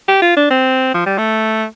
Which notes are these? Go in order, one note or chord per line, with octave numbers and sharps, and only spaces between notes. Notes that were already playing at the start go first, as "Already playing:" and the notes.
G4
F4
D4
C4
F3
G3
A3